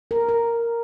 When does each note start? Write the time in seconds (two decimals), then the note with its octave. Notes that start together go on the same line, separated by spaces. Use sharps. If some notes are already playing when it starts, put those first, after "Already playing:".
0.11 A#4
0.29 A#4